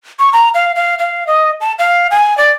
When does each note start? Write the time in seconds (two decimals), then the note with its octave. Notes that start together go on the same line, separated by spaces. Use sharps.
0.19 C#6
0.33 A#5
0.54 F5
0.76 F5
0.99 F5
1.27 D#5
1.61 A5
1.79 F5
2.11 G#5
2.38 D5